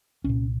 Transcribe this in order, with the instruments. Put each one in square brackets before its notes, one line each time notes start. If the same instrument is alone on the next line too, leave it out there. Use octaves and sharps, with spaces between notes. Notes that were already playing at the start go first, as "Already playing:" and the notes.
[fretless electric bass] C2 A#2 C#4